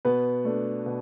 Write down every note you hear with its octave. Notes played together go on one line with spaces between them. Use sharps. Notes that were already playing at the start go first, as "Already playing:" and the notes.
B2 B3 B4
A3 D4
B2